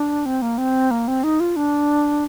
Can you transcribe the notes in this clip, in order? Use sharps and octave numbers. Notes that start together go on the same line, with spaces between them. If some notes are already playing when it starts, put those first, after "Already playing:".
Already playing: D4
C4
A#3
C4
A#3
C4
D#4
F4
D4